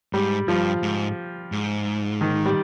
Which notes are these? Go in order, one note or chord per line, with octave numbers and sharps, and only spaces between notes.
G#2 G3
G2 F3
G#2
G#2
D#3
G3